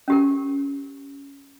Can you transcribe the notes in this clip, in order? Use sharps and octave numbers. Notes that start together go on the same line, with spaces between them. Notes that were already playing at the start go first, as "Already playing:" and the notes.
C#4 G4 A#4